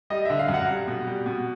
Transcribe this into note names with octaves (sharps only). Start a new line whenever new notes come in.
G3 D#5
D3 E5
F5
F#2
F#5
G3
B2
G3
B2